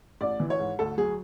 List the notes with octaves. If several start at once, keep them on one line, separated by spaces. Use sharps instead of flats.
A1 D5
E3
C#5
G#2
D2 A4
F#3 G#4